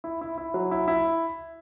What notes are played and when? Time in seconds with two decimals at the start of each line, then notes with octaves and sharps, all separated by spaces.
0.04 E4
0.21 E4
0.38 E4
0.54 F#3
0.71 E4
0.88 E4